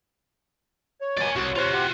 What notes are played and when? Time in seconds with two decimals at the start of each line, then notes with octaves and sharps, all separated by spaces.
1.01 C#5
1.17 A#2 F#3 D5 G#5
1.36 C2 F#4
1.56 C3 F4 F#4 C5
1.72 G4 F#5